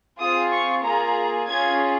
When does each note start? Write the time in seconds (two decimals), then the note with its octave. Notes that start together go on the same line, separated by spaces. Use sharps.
0.19 C4 F4 G#4 D#6
0.51 C#6
0.84 A#3 F4 G#4 A#5
1.49 C#4 F4 G#4 G#6